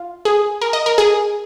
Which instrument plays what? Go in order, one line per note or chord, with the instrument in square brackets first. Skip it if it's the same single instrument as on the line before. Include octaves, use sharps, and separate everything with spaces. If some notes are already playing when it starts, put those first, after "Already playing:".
Already playing: [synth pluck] F4
G#4
A#4
D#5
A#4
G#4